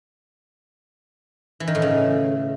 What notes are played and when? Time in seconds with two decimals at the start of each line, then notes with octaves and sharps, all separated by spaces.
1.60 E3
1.68 D#3
1.75 A2
1.82 C#3